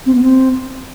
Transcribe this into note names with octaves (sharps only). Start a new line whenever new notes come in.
C4
B3
C4